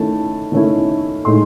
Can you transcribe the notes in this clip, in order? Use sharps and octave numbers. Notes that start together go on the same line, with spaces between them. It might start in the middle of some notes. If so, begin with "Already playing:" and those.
Already playing: D#3 A3 C#4 E4 A5
D#3 A3 C#4 E4
A2 G#3 D#4 C6